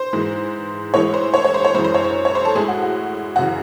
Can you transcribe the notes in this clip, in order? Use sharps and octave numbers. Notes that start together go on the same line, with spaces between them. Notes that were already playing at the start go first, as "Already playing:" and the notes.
Already playing: C5
G#2 E3 G#3
A2 E3 G#3 C#5
C5
C#5
C#5
C5
C#5
F#2 E3 G#3 C5
C5
C#5
C5
C#5
C5
A4
A2 G#3 G#4
F#4
F#4
F#2 C#3 E3 F#4